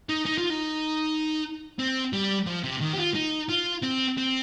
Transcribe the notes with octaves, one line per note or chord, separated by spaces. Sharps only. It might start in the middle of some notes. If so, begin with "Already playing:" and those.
D#4
D#4
F4
D#4
C4
G3
F3
C3
D#3
G4
F4
D#4
F4
C4
C4